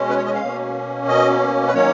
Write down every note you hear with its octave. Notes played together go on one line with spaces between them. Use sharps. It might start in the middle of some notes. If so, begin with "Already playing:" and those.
Already playing: B2 G#3 C#4
B4
C#5
D#5
F5
B2 A#3 C#4
D#5
B4
D#3 F#3 A#3 C#4 C#5